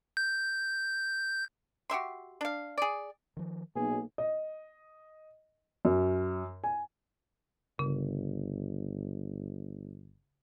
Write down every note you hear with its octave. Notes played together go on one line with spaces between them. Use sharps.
G6
F#4 G4 E5 C6
D4 F5
G#4 D5
D#3 F3
B1 A#3 G#4
D#5
F#2
G#5
G1 C#3